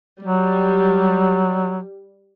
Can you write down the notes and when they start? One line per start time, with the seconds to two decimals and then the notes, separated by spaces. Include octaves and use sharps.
0.23 F#3 G3